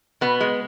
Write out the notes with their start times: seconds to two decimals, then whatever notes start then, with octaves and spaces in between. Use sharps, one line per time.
0.21 B2 B3
0.41 G#3